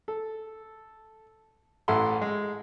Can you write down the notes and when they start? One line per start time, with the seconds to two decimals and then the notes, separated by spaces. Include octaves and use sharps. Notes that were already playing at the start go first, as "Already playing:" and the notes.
0.08 A4
1.88 A1 E4 A4 F#5 C6
2.21 G#3